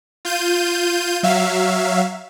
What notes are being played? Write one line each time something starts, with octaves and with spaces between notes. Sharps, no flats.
F4 G6 D#7
F#3 E5 F5